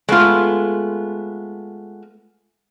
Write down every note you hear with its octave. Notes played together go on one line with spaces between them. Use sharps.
G#3 A3 B3 F4